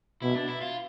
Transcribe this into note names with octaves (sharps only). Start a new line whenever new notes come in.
B2 E4
D4
E4
F4